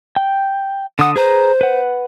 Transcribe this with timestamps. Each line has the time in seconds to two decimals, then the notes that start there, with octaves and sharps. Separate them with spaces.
0.16 G5
0.99 D3 F#5 D#6
1.16 G#4 B4 C5 A#5
1.61 B4 F#5